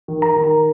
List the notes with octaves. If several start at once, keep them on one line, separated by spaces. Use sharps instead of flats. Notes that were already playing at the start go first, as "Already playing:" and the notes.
D#3
D#3 A#5
D#3
A#5